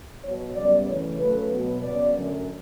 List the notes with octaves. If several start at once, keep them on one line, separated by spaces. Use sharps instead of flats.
B2 F#3 B3 C#5
F#2 C#3 G3 B3 D5
C#3 E3 A3 C#5
C#3 F#3 A3 B4
B2 F#3 B3
C#3 F#3 B3 D5
F#2 D3 A3